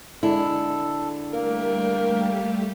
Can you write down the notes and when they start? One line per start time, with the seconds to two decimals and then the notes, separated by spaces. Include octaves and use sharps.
0.23 D3 G#3 E4 A4
1.33 G3 A3 A#3 G4 A#4